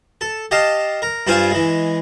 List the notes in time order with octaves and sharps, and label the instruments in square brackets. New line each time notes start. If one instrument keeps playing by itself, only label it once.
[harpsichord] A4
G4 D#5 F5 A5
A#4
G2 D4 F4 C5 F5 G#5
E3 G#3